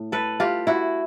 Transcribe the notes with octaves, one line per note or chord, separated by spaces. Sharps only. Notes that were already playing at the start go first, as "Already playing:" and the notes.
Already playing: A2
A4 B4
F4 G4
E4 F#4